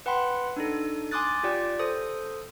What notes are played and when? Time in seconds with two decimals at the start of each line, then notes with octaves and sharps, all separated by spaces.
0.06 B4 F#5 G5 B5 C6
0.57 D4 D#4 A4
1.11 G#5 C6 D6 D#6 F#6 A6
1.43 F4 G4 D5 G5
1.79 A4 C5 D#6